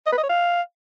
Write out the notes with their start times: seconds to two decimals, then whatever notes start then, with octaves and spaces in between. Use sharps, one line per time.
0.07 D#5
0.12 B4
0.18 D#5
0.24 C#5
0.29 F5